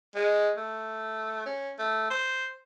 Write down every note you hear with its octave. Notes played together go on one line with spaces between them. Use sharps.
G#3
A3
C#4
A3
C5